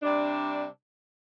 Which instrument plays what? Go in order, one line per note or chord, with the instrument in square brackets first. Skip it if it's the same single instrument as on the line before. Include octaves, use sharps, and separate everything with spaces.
[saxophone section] C3 G3 D4